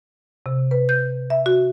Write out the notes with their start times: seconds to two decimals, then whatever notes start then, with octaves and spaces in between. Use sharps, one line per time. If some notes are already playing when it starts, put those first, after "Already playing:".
0.46 C3
0.71 B4
0.89 G6
1.30 E5
1.46 F#4